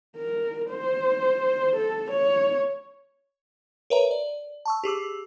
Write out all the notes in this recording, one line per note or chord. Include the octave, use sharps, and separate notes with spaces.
A#4
C5
A4
C#5
A#4 B4 C#5 E5 A#5
D5
A5 C#6 E6
G4 G#4 D6 E6